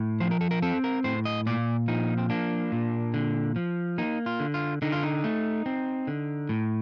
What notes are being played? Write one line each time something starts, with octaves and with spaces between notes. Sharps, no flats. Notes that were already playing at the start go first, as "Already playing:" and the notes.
Already playing: A2
F3 C5
A#4
A4
A#4
C4 A4
A#4
A2 C5
D#5
A#2 D5
F3 D#4
C4
A#3 D4
A#2
D3
F3
A#3 D#4
F4
D3
F4
D3 D#4
F4
D#4
A3
C4
D3
A2